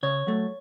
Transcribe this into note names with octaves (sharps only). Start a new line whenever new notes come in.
C#3 C#5
F#3 A3